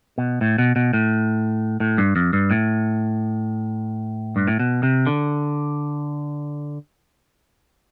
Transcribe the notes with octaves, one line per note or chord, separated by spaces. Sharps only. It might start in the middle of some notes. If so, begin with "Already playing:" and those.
B2
A2
B2
B2
A2
A2
G2
F2
G2
A2
G2
A2
B2
C3
D3